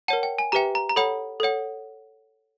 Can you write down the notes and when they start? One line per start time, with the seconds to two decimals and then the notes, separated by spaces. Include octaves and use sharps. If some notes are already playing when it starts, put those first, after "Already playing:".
0.08 A#4 C#5 F#5 A5
0.23 G5
0.38 G#5
0.52 G4 B4 E5 G5 A#5
0.75 A#5
0.89 A#5
0.96 A4 C#5 F#5 B5
1.40 A4 C#5 F#5